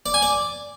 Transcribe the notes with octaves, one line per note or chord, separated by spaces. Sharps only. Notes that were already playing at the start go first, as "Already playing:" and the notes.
D5
G#5
D5